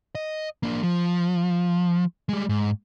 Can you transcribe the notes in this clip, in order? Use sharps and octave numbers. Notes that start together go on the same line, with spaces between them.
D#5
A#3 D4
F3
G3 G#3
G#2